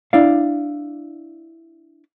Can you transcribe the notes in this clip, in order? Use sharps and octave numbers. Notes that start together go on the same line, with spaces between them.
D4 E4 D5 F5